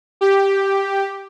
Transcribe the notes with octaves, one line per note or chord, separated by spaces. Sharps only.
G4